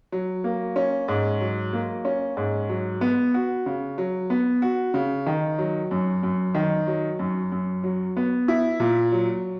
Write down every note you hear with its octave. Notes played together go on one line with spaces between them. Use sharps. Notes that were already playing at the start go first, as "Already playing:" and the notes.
F#3
A#3
C#4
G#2
F#3
A#3
C#4
G#2
F#3
B3
F#4
C#3
F#3
B3
F#4
C#3
D#3
F#3
F#2
F#2
D#3
F#3
F#2
F#2
F#3
B3
E4
A#2
F#3